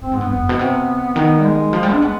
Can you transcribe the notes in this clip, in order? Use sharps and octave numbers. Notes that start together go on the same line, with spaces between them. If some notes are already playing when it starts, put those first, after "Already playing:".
B2 C4
G#2
G2 B3
F2 B3
G2
B2
C3
D#3
G3
G#3
F3
G3
D4
B3